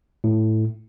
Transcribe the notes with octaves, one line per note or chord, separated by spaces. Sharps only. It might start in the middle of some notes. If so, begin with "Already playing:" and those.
A2